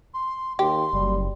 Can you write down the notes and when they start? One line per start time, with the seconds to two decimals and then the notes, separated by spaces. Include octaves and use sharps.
0.14 C6
0.59 D#2 G4 C6
0.93 F#1 G3